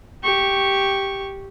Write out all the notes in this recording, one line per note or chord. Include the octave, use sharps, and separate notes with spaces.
G4 C#6